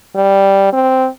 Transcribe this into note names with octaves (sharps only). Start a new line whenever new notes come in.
G3
C4